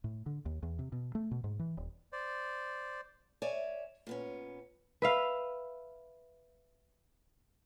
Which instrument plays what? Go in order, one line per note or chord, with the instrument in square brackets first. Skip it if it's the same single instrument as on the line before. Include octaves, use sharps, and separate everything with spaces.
[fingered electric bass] A2
D3
D#2
E2
C3
B2
A3
B2
G#2
E3
D#1
[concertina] C5 D5
[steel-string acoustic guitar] C#5 D5 E5 G#5
A#2 B3 C#4
[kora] B4 E5 F5